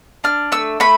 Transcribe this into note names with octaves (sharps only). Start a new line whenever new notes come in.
D4 F6
A3 E6
A3 B5